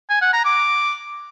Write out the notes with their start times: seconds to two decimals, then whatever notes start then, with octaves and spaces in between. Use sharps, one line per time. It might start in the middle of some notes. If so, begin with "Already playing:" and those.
0.10 G#5
0.21 F#5
0.33 A#5
0.45 D6